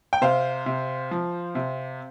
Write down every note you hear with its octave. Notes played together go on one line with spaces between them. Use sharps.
G5
C3 C5 F5
C3
F3
C3